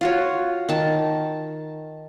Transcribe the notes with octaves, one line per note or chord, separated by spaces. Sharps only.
F4 F#4 C#5
D#3 A5